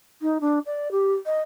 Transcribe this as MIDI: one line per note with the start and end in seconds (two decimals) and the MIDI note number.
0.21 0.38 63
0.40 0.59 62
0.65 0.91 74
0.91 1.13 67
1.25 1.41 75